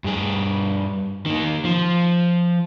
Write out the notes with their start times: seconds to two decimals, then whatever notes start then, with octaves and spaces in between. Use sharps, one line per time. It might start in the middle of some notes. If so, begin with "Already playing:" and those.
0.04 G2 G#4
1.26 D#3 A#3
1.65 F3